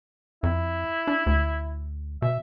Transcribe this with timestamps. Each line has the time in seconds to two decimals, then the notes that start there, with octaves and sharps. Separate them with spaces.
0.43 F2 E4
1.07 D4
1.26 D2
2.22 B2 E5